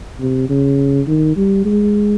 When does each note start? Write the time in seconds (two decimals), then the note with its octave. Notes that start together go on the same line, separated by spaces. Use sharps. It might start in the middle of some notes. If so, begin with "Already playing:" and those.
0.20 C3
0.49 C#3
1.07 D#3
1.36 G3
1.65 G#3